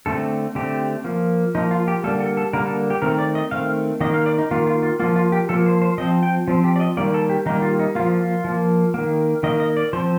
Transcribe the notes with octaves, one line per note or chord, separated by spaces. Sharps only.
D3 A3 C4 A4
D3 A3 C4 G4
F3 A#3
F3 A#3 D#4
F4
G4
D3 G3 A#3 A4
A4
A4
D3 G3 A#3 A#4
A4
G4
D#3 A3 C4 A#4
D5
D#5
D#3 A3 C4 F5
D#3 A#3 D#5
F5
D5
D#4
D#3 A#3 F4
F4
F4
F3 A#3 F4
F4
G4
F3 A#3 A4
C5
C5
F3 C4 D#5
G5
F3 C4
G4
D5
D#5
D#3 G3 A#3 D5
A4
G4
D#3 G3 A#3 D#4
F4
D#4
F3 A#3 F4
F4
F3 A#3
D#3 A#3
D#3 A#3 D#5
D#5
D5
F3 C4 C5